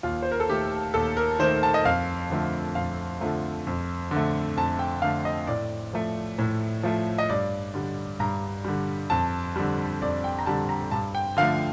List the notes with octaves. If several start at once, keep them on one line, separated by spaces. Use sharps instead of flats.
D#2 F4
C5
A#4
A4
D#3 A3 G4
D#2 A4
A#4
D#3 A3 C5
A5
D#5
F2 F5
D3 F3 A3
F2 F5
D3 F3 A3
F2
D3
A3
F2 A5
G5
D3 A3 F5
D#5
A2 D5
F3 A3
A2
F3 A3
D#5
G2 D5
D3 G3
G2 A#5
D3 G3
F2 A5
D3 G3
F2 D5
G5
A#5
D3 G3 A5
A#5
G2 A5
G5
D3 F3 A3 F5